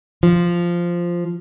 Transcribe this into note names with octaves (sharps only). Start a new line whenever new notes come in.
F3